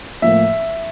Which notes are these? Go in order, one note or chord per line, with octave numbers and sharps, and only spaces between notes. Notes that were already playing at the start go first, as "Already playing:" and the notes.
A2 F3 A#3 E5